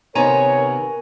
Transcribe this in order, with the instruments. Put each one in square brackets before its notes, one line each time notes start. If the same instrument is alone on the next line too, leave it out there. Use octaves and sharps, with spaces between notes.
[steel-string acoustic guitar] C3 D#3 B3 [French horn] A#4 [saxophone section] C#5 [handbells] G#5 A#5